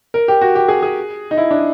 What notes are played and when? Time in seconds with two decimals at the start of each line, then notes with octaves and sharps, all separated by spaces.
0.14 A#4
0.28 G4
0.41 F#4
0.55 G4
0.68 G#4
0.83 G#4
1.31 D#4
1.37 E4
1.51 D4